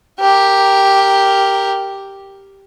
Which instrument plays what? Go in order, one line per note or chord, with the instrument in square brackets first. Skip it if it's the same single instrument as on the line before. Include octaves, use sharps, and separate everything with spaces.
[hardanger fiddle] G4 A#4